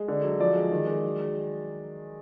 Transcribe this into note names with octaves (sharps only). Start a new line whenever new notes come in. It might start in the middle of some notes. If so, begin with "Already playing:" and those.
Already playing: G#3
D3
F#3
F3 D5
G#3
D#3
G#3
F#3